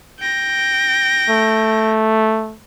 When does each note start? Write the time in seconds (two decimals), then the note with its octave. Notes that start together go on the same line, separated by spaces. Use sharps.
0.20 G5 A#6
1.30 A3